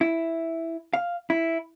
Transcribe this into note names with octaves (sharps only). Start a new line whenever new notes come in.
E4
F5
E4